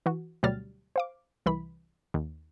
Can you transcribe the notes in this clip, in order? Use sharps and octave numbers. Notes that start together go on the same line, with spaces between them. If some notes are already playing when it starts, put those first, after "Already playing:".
E3 F#4
D2 B2 F#3 G3 F6 A6
C5 F5 D6
C2 E3 B5
D#2